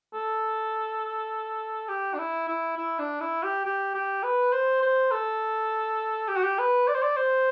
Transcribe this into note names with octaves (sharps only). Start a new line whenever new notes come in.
A4
G4
D4
E4
E4
E4
D4
E4
G4
G4
G4
B4
C5
C5
A4
G4
F#4
G4
B4
D5
C5
D5
C5